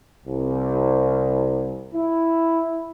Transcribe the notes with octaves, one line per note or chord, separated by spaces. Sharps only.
C2
E4